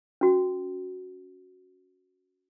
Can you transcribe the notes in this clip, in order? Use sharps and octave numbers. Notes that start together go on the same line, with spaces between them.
C#4 F#4